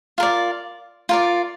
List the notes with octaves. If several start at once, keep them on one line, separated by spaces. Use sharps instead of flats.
F4 A#4 D5
F4 A#4 D5